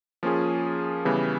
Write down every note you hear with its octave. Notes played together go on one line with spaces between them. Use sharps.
F3 A#3 C#4 F4 G#4
C#3 E3 G3 B3